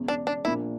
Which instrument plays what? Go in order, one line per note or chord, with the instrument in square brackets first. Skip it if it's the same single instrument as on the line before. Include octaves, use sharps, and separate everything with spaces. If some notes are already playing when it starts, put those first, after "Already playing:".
Already playing: [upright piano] E1 E2 C#3
[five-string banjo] D4
D4
[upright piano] A#1 A#2 A#3 D4 [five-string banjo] E4